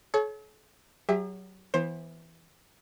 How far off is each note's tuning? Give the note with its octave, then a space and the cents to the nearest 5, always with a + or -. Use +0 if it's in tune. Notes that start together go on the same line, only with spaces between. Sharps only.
A4 -45 C#5 +0 C#6 +0
F#3 +25 G#4 -45 E5 -5
E3 +0 B3 +0 C5 +25